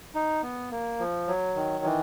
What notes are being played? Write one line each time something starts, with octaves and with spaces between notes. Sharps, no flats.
D#4
B3
A#3
F3
F#3
D#3
E3